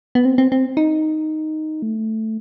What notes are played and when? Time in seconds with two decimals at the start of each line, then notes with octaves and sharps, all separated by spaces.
0.15 B3
0.25 C4
0.38 C4
0.52 C4
0.77 D#4
1.82 A3